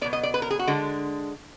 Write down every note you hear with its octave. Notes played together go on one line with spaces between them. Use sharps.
B2 F#3 B3 D5
D#5
D5
B4
A#4
G#4
F#4
D3 G#3 D4